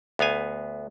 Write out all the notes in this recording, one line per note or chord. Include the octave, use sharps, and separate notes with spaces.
D2 B3 F5 G#5